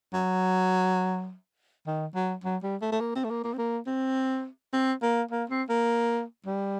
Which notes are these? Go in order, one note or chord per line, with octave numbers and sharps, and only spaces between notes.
F#3
D#3
F#3
F#3
G3
A3
A3
A#3
C4
A3
A#3
A#3
C4
A#3
C4
C4
A#3
A#3
C4
A#3
G3